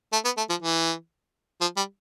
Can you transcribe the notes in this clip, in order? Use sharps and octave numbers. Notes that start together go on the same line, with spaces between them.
A3
B3
A3
F3
E3
F3
G3